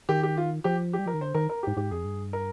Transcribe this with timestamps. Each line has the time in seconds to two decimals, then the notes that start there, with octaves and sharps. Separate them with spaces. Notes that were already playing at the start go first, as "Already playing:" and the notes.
0.09 D#3 G4
0.23 G4
0.37 F4
0.64 F3 G4
0.93 G4
0.99 G3
1.06 F3 A#4
1.14 D#3
1.20 D3 C5
1.35 D#3 A#4
1.50 A#4
1.63 G#2 G4
1.77 G#2 G4
1.91 F2 G#4
2.05 G2
2.33 A#4